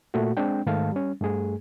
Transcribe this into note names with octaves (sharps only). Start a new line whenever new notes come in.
A#2 A3 F#4
G#3 C4 D4 G5
G#2 D#3 A3 F5 A5
G3 C#4
G2 A3 G#4